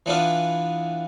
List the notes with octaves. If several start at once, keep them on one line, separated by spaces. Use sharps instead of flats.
E3 B3 D4 F4 B4